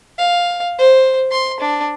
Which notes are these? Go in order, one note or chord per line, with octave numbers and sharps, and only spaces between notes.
F5
C5
C6
D4